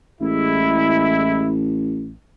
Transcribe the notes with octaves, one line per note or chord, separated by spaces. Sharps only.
A1 G#3 E4